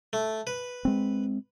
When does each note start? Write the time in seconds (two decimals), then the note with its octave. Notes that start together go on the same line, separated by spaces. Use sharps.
0.13 A3
0.47 B4
0.85 G#3 C4